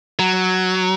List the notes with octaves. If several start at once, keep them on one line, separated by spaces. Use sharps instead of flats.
F#3